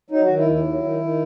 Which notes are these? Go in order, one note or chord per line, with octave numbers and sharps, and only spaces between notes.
F#3 D#4
D#3 F#4
E4
D#2
E4
F#3
D#3
D#3